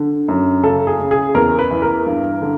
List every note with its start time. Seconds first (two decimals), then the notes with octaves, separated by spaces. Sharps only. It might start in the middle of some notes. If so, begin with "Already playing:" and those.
Already playing: D3
0.28 F#2
0.63 C#3 A4
0.87 G#4
0.99 C#3
1.11 G#4
1.34 E2 A#4
1.59 B4
1.71 E3
1.82 A#4
2.06 G2
2.42 D3